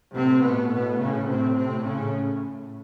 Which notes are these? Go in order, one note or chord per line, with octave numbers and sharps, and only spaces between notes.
A2 C3 C4
B2 B3
B2 B3
C#3 C#4
C3 C4
C3 C4
C#3 C#4